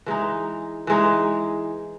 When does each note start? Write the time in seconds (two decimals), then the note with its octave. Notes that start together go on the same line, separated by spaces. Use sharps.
0.06 E3 G#3 D#4
0.87 E3 G#3 D#4